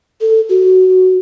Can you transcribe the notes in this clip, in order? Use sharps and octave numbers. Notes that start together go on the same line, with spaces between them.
A4
F#4